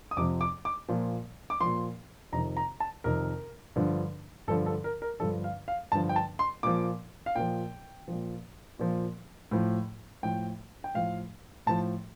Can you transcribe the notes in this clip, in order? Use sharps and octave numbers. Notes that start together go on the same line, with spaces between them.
D#6
F2 C3 F3 D6
D6
D6
A#2 F3
D6
A#2 F3 C6
F2 C3 D#3 A#5
A#5
A5
F2 C3 D#3 A#4
G2 D3 F3
G2 D3 F3 A4
A4
A#4
A#4
G2 D3 F3 A4
F5
F5
G2 D3 F3 A5
G5
A5
C6
A#2 F3 D6
F5
A#2 F3 G5
A#2 F3
A#2 F3
A2 F3
A2 F3 G5
G5
A2 F3 F5
A2 F3 A5